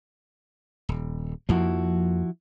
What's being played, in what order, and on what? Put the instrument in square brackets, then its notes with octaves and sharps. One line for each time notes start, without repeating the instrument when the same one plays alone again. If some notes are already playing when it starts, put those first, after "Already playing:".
[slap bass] D#1
[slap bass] F2 A#3 [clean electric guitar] F3 E4 F#4